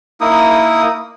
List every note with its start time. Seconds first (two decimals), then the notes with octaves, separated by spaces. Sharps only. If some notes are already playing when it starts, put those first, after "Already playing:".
0.21 A#3 D#4 E4 D#6